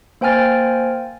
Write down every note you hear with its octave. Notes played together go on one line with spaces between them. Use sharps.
A#3 C5 G5 G#5 F6 A6